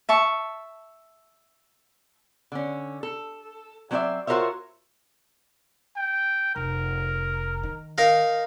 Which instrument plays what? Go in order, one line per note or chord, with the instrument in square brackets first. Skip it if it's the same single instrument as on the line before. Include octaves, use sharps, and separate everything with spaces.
[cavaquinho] E5 A5 C#6
[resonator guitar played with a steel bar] D3 C#4
A4
F#3 C4 D4 A4 D5 E5
F4 F#4 A#4 C5 C#5 E5
[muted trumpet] G5
[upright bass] F1 [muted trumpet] A#4
[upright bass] D#3
[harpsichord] D#4 A#4 F5